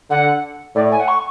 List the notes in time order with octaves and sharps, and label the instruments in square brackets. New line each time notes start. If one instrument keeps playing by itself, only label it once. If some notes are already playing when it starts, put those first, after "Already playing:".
[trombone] D3 [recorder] F#5
[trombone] A2 [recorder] D5
[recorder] G#5
F#5
C#6